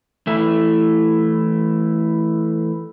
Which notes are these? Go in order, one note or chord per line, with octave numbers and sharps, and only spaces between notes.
E3 A3 E4